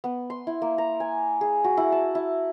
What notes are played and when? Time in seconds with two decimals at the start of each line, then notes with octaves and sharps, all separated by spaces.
0.04 B3
0.30 C6
0.47 E4
0.62 A#3
0.78 A#5
1.00 G#5
1.41 G#4
1.64 F#4
1.77 E4
1.92 A5
2.15 E4